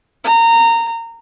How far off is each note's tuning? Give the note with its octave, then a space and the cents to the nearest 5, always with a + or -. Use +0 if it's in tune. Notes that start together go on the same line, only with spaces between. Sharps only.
A#5 -20